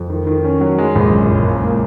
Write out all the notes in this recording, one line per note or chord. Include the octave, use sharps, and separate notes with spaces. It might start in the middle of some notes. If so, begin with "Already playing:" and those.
Already playing: F2
D#3
D#3
C#4
F#3
G#3
A#1
F#2
F#1
C#2
A#3